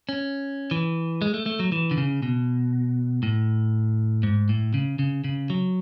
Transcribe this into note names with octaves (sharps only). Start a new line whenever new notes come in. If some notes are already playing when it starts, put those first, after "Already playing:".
C#4
E3
G#3
A3
A3
F#3
E3
D3
C#3
B2
A2
G#2
A2
C#3
C#3
C#3
F#3